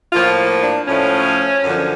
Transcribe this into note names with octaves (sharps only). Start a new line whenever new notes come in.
A2 F3 A#3 F4
D4
A2 F3 A3 C#4
F#2 D3 F3